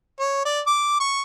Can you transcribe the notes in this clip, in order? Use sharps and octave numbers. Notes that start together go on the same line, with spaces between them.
C#5
D5
D6
C#6